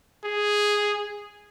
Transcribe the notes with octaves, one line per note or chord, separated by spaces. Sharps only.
G#4